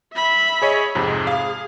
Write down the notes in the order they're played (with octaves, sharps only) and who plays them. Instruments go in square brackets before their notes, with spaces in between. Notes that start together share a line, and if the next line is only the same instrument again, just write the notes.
[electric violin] E5 B5
[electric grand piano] G#4 C#5 D#5
[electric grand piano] F2 G#2 C3 [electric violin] G#4
[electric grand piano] F5